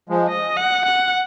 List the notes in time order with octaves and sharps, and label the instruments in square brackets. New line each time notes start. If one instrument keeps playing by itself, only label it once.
[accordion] F3 G#3
[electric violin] D#5
F#5
F#5